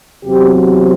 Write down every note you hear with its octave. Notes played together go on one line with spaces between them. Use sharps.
E2 C3 F#3 C4 G4